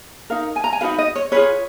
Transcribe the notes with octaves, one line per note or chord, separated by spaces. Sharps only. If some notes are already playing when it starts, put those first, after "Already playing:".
D#4 A#4 F5
G#5
A#5
G#5
D#4 F#4 B4 F5
D#5
C#5
F4 G#4 B4 C#5